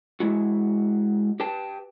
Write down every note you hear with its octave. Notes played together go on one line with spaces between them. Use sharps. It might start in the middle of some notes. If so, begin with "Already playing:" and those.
G#3 E4 F#4
G4 B4 G5 A5